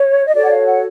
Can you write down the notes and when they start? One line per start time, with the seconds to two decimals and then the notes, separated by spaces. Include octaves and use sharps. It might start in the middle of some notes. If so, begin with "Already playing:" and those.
Already playing: C#5
0.27 D#5
0.34 F#4 A4 C#5 D5
0.44 F#5
0.51 F5
0.66 F#5